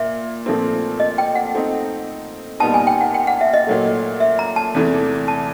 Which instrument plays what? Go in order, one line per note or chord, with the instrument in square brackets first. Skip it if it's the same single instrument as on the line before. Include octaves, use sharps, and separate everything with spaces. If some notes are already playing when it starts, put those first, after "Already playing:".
Already playing: [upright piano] A#2 [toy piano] E5
[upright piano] A#2 F3 A3 C4
[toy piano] D#5
G5
F#5
[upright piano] A3 C4 D#4
[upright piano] A#2 G3 B3 D#4 [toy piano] A5
[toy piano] G#5
G5
F#5
G5
F#5
E5
D#5
[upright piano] A#2 F#3 A3
[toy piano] E5
A#5
A5
[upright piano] E2 C3 E3 A3
[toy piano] A5